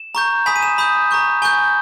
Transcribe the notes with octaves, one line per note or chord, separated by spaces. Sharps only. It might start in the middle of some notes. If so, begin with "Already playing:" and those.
Already playing: E7
A#5 C#6 G6
G#5 B5 D#6 B6
D#7
E7
B5 D#6 G6
A#5 C#6 G6
G#5 C#6 G6 G7